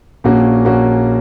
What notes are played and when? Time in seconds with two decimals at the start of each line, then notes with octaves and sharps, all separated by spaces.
0.24 A#1 A#2 A#3 C#4 F#4
0.65 A#1 A#2 A#3 C#4 F#4